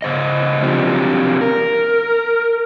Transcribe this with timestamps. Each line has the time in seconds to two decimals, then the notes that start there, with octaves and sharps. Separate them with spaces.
0.02 C#3 C5 D#5
0.62 F3 F#3 C4 D4 F4 G4
1.41 A#4